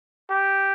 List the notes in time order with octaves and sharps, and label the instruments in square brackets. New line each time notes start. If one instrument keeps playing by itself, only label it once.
[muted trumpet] G4